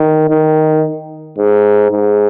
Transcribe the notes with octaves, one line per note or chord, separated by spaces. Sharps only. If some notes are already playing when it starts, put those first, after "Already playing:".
Already playing: D#3
D#3
G#2
G#2